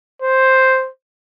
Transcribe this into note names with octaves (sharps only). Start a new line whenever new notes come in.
C5